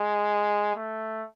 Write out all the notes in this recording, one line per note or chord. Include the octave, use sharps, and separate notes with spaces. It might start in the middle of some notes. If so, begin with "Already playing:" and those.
Already playing: G#3
A3